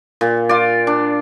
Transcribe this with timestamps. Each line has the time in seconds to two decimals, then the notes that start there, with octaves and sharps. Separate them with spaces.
0.21 A#2
0.49 F4 D5
0.87 D4